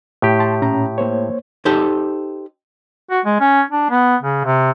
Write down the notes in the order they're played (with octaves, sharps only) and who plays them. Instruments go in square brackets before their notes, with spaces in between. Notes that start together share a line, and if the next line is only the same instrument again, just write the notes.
[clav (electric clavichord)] A2 G4
[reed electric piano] A5 C6
A#2 C#4 A#5
A#3 C5 C#5
[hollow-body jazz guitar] D#4 G4 A4 C5
[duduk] F#4
G#3
C#4
D4
B3
C#3
C3